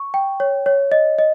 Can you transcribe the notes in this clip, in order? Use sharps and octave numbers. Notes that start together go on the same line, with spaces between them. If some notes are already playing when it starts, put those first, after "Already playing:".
Already playing: C#6
G5
C#5
C#5
D#5
D#5